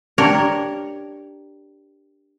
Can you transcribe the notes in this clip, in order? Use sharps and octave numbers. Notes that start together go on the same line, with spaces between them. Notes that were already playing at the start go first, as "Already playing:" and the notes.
D4 G4 A#4 C#5